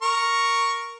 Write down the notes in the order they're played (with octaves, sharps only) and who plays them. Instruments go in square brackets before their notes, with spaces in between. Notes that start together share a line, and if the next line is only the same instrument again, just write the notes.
[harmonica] A#4 C#6